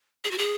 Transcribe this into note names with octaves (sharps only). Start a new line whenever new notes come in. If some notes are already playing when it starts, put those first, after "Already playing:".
G#4
F#4
G#4